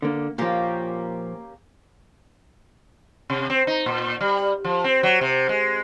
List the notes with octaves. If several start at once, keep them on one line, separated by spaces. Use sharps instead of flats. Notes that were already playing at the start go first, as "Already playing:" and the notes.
D3 A#3
A#2 F3 A#3 C#4 G4
C3
C4
D#4
A#2
G3
F3
C4
F#3
C3
G#3